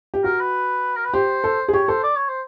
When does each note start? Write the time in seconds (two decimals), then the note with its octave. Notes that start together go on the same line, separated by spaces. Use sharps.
0.14 G4
0.24 F#4 A#4
0.40 B4
0.96 A#4
1.05 B4
1.14 G4 C5
1.44 A4
1.68 G#4
1.73 G4 C#5
1.88 A4 C5
2.04 D5
2.16 C#5
2.29 C5